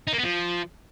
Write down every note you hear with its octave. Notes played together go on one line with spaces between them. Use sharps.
D#4
A#3
B3
F3